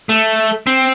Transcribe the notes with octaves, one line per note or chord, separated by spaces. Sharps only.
A3
C4